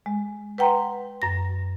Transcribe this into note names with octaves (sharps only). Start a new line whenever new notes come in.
G#3
B4 F#5 G5 A#5 C6
F#2 A#6